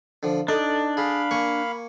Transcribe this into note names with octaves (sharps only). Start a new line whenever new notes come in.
D3 F3
D4 D#4 A4 D5
G#4 F5 B5
A#3 G#5 C#6